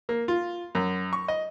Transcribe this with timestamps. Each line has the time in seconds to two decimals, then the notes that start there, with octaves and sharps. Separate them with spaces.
0.09 A#3
0.28 F4
0.75 F#2
1.13 C#6
1.28 D#5